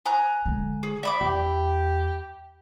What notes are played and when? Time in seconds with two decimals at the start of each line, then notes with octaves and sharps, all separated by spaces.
0.06 G#5 A#5 F#6
0.46 D3 G#3
0.83 G#4
1.03 D5 E5 B5 D6
1.21 E2 G4